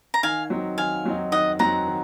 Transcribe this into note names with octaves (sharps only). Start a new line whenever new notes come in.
A#5
D#3 F5 G#5
F#3 C4 D#4
D#3 F5 G#5
F#3 C4 D#4
D#3 D#5 F#5
F#3 C4 D#4 F#5 A#5
D#3